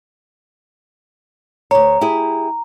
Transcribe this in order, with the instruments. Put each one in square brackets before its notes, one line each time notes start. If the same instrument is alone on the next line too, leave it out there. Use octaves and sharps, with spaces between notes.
[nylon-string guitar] D2 C#5 [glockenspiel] A#5
[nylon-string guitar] E4 G4 G#4